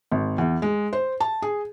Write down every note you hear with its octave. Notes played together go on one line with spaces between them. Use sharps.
G#1
E2
G#3
C5
A5
G#4